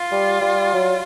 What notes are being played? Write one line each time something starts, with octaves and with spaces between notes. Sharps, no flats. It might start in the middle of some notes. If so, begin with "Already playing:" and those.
Already playing: F4
G3
G3
F#3